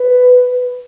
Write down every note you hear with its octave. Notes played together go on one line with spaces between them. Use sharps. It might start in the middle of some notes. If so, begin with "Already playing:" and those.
Already playing: B4